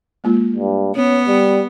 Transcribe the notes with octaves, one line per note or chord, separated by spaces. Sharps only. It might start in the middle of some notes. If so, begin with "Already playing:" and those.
G#3 A#3 F4
G2
B3 C#4
G3